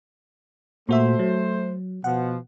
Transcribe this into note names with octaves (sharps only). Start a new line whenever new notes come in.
A#2 A3 F#4 C5 E5
F#3
B2 F3 F#5